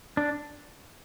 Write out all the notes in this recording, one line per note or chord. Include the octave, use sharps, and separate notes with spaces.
D4